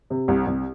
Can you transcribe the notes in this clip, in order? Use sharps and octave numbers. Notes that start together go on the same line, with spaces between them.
C3
C2
C2